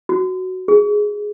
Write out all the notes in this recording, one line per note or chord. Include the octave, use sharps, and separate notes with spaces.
F#4
G#4